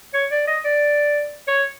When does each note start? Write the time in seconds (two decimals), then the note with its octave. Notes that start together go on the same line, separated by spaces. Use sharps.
0.14 C#5
0.31 D5
0.48 D#5
0.65 D5
1.48 C#5